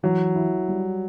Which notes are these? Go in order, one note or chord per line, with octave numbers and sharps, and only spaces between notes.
E3 F#3
E4
G3